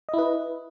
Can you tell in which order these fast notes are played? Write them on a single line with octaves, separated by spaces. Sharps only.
D#5 E4 B4